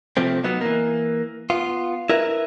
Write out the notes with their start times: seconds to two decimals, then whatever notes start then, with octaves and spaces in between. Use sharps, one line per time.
0.17 C3 F3 A3 C4
0.44 F#3 B3 D#4
0.61 E3 A#3
1.50 B3 F4
2.10 E4 A#4 B4 E5